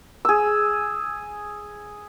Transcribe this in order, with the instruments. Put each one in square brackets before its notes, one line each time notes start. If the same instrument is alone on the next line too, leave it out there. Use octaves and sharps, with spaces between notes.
[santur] G#4 E6